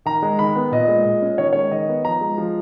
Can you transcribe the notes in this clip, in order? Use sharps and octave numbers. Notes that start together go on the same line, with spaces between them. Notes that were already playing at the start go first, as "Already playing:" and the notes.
D#3 A#5
G#3
D#3 B5
B3
A#2 D#5
G#3
A#2
C#4
D#3 C#5
G#3 C#5
D#3 D#5
B3
F3 A#5
G#3
F3